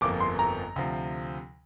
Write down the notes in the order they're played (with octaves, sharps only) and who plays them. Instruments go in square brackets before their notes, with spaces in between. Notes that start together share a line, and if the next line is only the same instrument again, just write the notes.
[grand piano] G1 F2 F3 A#3 [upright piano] D6
[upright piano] C6
A#5
[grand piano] D2 C3 F3